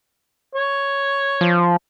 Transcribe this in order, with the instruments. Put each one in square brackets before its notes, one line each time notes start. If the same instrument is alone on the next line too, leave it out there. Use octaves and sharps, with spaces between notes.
[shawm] C#5
[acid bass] F3